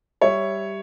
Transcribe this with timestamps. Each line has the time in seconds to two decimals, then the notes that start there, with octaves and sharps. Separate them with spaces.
0.22 G3 C#5 E5